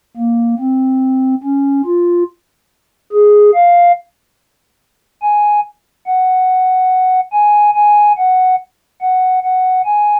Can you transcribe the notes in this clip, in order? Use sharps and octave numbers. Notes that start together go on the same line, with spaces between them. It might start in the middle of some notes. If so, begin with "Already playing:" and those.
A#3
C4
C#4
F4
G#4
F5
G#5
F#5
G#5
G#5
F#5
F#5
F#5
G#5